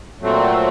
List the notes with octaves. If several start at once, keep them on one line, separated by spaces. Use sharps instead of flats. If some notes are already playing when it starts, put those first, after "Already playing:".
A#2 F#3 A3 C4